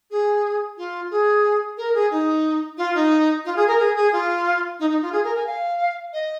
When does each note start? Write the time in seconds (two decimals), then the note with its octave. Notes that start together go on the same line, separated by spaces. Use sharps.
0.11 G#4
0.77 F4
1.11 G#4
1.78 A#4
1.94 G#4
2.11 D#4
2.77 F4
2.95 D#4
3.45 F4
3.56 G#4
3.67 A#4
3.79 G#4
3.96 G#4
4.12 F4
4.80 D#4
4.90 D#4
5.02 F4
5.12 G#4
5.24 A#4
5.36 G#5
5.46 F5
6.13 D#5